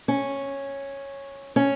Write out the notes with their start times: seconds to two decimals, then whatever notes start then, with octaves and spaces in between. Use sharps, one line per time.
0.08 C#4
1.56 C#4